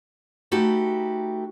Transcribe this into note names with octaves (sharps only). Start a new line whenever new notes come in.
A3 D#4 F#4 G4 A4 B4